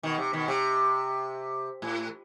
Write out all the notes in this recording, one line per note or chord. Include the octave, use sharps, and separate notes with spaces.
B2 D#3
C3
B2 D#3
C3
A2